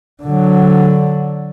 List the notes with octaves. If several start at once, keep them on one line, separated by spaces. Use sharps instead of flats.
D3 F#3